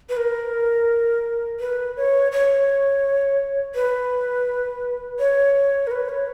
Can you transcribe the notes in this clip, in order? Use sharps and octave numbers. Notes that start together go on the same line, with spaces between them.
B4
A#4
B4
C#5
C#5
B4
C#5
A#4
B4
C#5